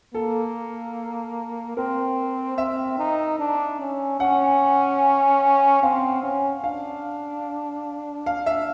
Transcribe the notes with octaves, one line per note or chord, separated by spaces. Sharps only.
A#3 A4
C4 A#4
C4 E5
D#4
D4
C#4
C#4 F#5
C4 F5
C#4
D4 F5
F5
E5